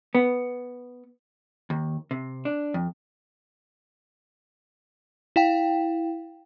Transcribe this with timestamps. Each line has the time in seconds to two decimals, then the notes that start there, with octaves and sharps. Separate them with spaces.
0.15 B3
1.70 D#2
2.11 C3
2.45 D4
2.74 F2
5.36 E4 F5 G5